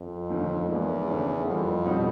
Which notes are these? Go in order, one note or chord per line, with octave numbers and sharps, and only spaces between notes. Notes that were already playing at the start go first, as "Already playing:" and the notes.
Already playing: F2
D#2 D3 F3 A3
E2 G#2 F3 A#3
D#2 C#3 F#3 A3 D4
F2 E3 G3 A#3
B2 G3 C4 D#4 F#4